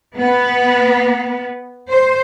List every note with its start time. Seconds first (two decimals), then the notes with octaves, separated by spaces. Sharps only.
0.17 B3
1.89 C5